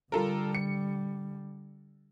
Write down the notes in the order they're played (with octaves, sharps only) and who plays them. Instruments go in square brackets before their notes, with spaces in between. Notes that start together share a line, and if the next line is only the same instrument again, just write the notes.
[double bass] D3 G3 [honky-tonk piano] F4 A4 A#4
[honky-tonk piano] C#7